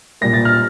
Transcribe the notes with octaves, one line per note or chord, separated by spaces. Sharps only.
A#2 G3 A#3 A#6
A6
F6